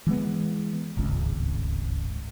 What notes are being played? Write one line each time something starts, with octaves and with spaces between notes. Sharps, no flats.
E3 G#3 B3
D1 G#1 C#2